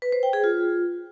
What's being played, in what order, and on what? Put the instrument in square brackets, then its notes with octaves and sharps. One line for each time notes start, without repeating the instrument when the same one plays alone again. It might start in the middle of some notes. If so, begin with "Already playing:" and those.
[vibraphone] B4
C5
G5
G#4
F4